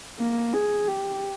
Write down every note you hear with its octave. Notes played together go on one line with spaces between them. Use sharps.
A#3
G#4
G4